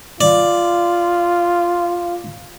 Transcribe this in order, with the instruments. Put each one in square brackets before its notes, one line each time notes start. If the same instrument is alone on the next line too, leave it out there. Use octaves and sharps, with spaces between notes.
[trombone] F4 [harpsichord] D5